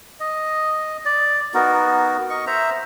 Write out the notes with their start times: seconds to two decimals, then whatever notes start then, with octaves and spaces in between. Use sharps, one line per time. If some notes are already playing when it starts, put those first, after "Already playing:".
0.20 D#5
1.05 D5
1.54 B3 D#4 F#4 A#4
2.30 D#5 C#6
2.47 C5 E5 A#5